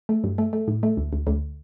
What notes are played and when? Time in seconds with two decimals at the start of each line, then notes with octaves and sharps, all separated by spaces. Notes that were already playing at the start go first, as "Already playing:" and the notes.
0.09 A3
0.24 G2
0.38 A3
0.53 A3
0.68 A2
0.83 A3
0.97 D2
1.13 D2
1.27 D2